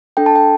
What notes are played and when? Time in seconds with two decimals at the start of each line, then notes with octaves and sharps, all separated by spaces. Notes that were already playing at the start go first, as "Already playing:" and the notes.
0.17 D4 A4 G5
0.26 A5
0.35 G5